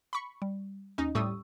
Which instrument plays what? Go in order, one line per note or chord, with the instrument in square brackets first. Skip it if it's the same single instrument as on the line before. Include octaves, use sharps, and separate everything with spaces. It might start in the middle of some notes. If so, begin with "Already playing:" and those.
[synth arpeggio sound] B5 C#6
[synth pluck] G3
[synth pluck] D#2 C#4 [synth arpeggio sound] D#4
[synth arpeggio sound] A2 G3 D#6 [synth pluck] C#6 E6